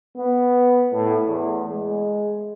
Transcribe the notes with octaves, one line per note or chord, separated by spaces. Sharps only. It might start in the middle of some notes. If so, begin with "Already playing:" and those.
B3
A2
E2
G#3